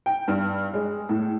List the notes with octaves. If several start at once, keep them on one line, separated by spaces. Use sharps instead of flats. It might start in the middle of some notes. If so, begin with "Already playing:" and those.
G5
G2
G#3
A2